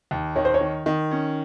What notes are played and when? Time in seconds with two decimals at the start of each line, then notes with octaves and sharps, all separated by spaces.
0.11 D#2
0.36 D#3 C#5
0.45 C5
0.54 C#5
0.61 D#3
0.86 D#3
1.11 C#4